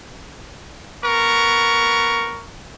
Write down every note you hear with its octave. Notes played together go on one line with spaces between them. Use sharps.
B3 A#4 C#6